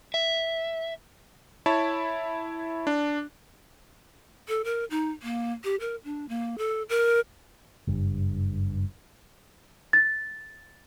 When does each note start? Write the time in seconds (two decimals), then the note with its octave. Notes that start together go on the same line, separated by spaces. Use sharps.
0.14 E5
1.66 E4 C#5 A5 B5
2.87 D4
4.48 A4
4.64 A#4
4.90 D#4
5.22 A#3
5.64 G4
5.80 A#4
6.04 D4
6.29 A#3
6.58 A4
6.89 A#4
7.87 F#1 G2
9.93 A6